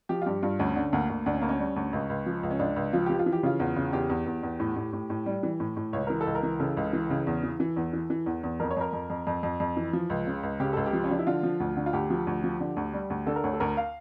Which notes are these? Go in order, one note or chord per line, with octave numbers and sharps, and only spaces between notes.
F3 G4
F4
G2 G4
G2 F4
D2 C#4
D3
D2 A#3
D2
D2 D4
C#4
D2 A#3
C#4
G3
D2
C#2
C#2
F3
C#2
C#4
C#2 D4
C#2
F3 F4
F3 G4
F4
E3
G4
C#3 F4
E2
C#3
E2 G4
E2
E2
E2
A2
A2
A2
A2
G3
E3
A2
A2
C#2 C#5
E3 A#4
A4
C#2
A#4
E3
C#3 A4
C#2
E3
C#3
E2
E3
E3
E2
E3
E3
E2
E2
F2 A#4
C#5
F2 A#4
F2
F2
F2
F2
F2
E3
F3
C#2
C#3
C#2
C#3 G4
C#2 A4
G4
F3
C#4
F3 D4
E4
D3 F4
F3
D2
D3
F4
D2 G4
F3
D2
F3
D3
D2
G3
D2
D3 A4
A#4
D2 C#5
A4
D2 A#4
F5